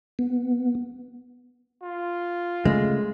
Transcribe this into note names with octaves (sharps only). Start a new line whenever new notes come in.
B3
F4
C#3 G#3 A3